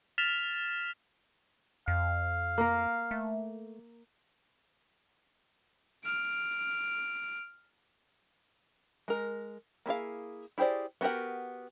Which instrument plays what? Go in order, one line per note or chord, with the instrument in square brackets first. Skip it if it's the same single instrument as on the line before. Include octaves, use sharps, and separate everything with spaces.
[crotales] F6 A6 B6 E7 F7
[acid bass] F2 [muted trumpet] F5
[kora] A#3 A#4
[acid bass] A3
[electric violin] F6 D7
[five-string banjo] G#3 A#4
A#3 E4 G#4 F5
E4 G4 G#4 C5 D5
B3 F#4 G4 A#4 F#5